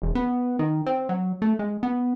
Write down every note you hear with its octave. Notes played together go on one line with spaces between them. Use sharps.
E1
B3
D#3
C4
F#3
A3
G#3
B3